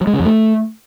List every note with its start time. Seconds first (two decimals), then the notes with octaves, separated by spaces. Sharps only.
0.01 F#3
0.07 G#3
0.13 C#3
0.20 F2
0.26 A3